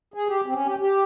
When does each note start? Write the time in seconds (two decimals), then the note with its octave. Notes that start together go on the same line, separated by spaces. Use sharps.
0.14 G#4
0.27 G4
0.46 C4
0.53 C#4
0.66 G4
0.79 G4